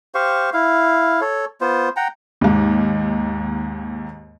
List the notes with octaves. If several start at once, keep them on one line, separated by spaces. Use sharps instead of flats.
G4 C5 F5 C#6
E4 F5
A4 C#5
B3 F4 C5
F#5 G5 A#5
D#2 G#2